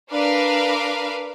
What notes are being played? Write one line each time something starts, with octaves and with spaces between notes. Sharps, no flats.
D4 A#4 B4 F5 D6